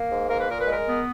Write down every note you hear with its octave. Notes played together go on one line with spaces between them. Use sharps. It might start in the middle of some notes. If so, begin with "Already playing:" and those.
Already playing: A#3
G#2
A#3 A#4
B4
A#2 A#4
B4
G#3 A#4
B3